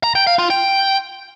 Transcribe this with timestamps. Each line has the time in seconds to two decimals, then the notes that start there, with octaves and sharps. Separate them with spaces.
0.04 A#5
0.15 G5
0.27 F5
0.39 F4
0.50 G5